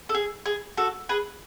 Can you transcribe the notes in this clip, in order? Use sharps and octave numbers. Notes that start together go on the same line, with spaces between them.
A4
G#4
G#4
F#4 A4
G#4 B4